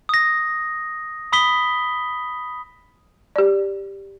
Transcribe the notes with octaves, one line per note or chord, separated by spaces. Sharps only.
D#6 A#6
B5 D#6 B6 G7
G4 D5